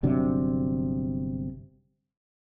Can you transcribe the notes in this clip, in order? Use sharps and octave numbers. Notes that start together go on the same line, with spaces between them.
G1 C3 F#3 D4